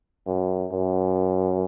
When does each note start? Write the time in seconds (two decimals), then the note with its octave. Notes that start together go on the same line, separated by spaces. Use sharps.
0.27 F#2
0.72 F#2